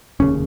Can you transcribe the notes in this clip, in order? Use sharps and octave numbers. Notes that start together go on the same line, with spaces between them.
F1 D#2 C#3 C#4